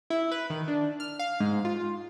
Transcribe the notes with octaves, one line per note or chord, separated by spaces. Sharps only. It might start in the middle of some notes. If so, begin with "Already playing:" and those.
E4
B4
D#3
D4
F6
F5
G#2
F4